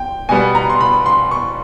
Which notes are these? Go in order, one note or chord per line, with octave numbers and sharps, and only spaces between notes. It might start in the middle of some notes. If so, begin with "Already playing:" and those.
Already playing: G5
B2 G3 B3 G#5
A#5
C6
B5
C6
C#6